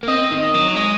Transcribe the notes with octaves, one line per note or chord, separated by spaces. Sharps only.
A#3
C4 D#5
D#3
D#5
F#3
G#3 D#5